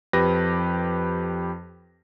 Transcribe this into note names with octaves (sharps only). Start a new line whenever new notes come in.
F2 G4 B4 A#6